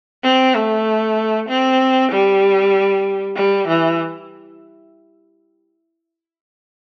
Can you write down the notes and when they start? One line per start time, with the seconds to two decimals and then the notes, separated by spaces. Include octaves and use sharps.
0.24 C4
0.54 A3
1.48 C4
2.11 G3
3.36 G3
3.68 E3